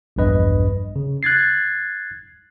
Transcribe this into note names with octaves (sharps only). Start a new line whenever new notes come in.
A#1 E2 G2 B4 D#5
C#3
F#6 G#6 A6 C7